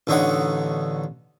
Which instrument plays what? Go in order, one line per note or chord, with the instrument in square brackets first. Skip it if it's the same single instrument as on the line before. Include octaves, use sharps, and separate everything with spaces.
[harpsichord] A1 D3 D#4 C#5 F#5